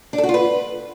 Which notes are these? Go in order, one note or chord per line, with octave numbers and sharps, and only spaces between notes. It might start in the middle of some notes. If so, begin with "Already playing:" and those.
D4
A4
F#4
F4
B4